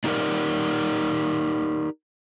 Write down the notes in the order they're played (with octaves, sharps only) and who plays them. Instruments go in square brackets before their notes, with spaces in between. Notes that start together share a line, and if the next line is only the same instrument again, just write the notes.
[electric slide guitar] D4 D#4 G4 G#4 A#4 D5